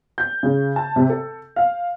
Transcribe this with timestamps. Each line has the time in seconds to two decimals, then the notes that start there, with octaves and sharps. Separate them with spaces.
0.18 G6
0.43 C#3
0.76 A5
0.96 C3
1.09 A4
1.56 F5